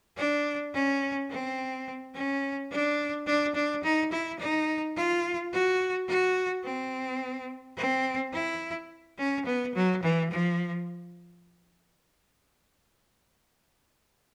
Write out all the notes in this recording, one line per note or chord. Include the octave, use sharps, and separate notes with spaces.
D4
C#4
C4
C#4
D4
D4
D4
D#4
E4
D#4
F4
F#4
F#4
C4
C4
E4
C#4
B3
F#3
E3
F3